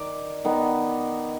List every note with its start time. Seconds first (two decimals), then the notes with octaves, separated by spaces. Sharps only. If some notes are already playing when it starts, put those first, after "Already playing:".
Already playing: D#3 D5
0.45 D#3 B3